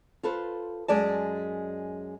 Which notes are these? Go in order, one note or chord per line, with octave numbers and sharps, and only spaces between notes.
F4 A4 B4 C5
F#2 G#3 D5 A5